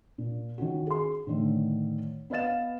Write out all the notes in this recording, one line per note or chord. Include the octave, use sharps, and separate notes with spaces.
A#2
D#3 C#4 F4 F#4
G#4 C6
A2 D3 D#3 A3
B3 B4 D#5 F5 A6 E7